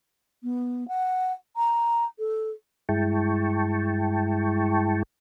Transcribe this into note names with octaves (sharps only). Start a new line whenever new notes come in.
B3
F#5
A#5
A4
G2 G#3 E4 G5 A5 C#6